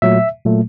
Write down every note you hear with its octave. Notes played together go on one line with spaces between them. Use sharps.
A#2 F#3 A3 E5
A#2 F#3 A3